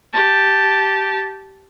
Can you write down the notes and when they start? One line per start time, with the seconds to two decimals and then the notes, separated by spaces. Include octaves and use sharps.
0.13 G4 A5